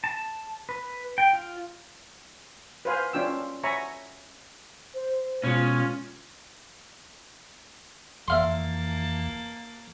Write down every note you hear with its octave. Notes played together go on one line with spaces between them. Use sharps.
A5
B4
G5
F4
B4 C5 F5 G#5
C#4 D4 F4 G5 E6
C#5 E5 G#5 A#5 B5 C#6
C5
B2 G#3 C#4 F4
F2 E3 A#3 E5 F5 A5 C6